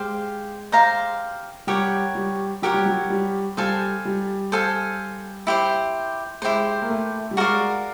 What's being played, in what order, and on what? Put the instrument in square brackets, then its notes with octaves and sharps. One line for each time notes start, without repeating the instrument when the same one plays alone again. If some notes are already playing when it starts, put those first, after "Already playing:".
Already playing: [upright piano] G#3 [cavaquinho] G4 C5 F5
[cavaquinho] G4 C5 F5 A#5
[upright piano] G3 [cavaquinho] G4 A#4 C#5 F#5
[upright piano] G3
[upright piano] F#3 [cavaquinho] G4 A#4 C#5 F#5
[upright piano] G3
F#3
G3
[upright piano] G3 [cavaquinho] A4 C5 F5 G#5
[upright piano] G3
[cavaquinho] A4 C5 F5 G#5
E4 G4 C5
[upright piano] G#3 [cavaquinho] E4 G4 C5
[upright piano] A#3
A3
G3
[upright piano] G#3 [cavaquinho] F#4 A#4 D5 F5